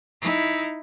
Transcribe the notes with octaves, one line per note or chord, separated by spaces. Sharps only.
D#4 E4